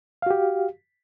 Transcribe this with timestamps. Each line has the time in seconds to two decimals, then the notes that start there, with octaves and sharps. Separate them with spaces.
0.22 F5
0.26 F#4
0.31 G4